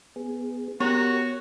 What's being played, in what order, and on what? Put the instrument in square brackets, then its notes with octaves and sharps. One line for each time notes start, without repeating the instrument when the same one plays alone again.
[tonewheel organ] B3 G#4
[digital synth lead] B3 [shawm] F#4 [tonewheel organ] G4 A#4 A#5 [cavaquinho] C#5